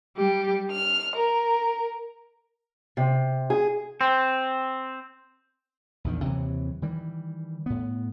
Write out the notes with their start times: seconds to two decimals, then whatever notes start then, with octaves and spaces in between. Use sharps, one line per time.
0.17 G3 G4
0.71 F6
1.16 A#4
2.97 C3
3.50 G#4
4.01 C4
6.04 A#1 E2 D#3
6.25 D#2 C3 E3 F#3
6.82 D#3 E3 G3
7.66 A2 B3